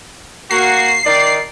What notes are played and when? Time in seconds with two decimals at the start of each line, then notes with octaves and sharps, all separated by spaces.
0.51 A#3 F#4 C7
1.05 D#3 D5